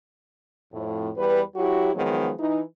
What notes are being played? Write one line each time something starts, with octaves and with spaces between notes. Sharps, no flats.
F2 A2
E2 G3 B4
F#3 E4 F#4 G4
D#3 F3 F#3 G#3 B3
E3 D#4